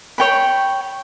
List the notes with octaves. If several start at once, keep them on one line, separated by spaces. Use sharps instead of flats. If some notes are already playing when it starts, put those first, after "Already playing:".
C#5 G5 B5